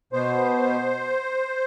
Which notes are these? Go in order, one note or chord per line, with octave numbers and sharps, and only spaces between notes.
B2 B3 C5